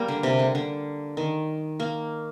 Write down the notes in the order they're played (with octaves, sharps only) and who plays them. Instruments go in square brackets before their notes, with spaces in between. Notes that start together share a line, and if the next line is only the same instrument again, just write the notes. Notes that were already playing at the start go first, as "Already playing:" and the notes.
Already playing: [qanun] G3 A#3
D3
C3
D3
D3
D#3
A#3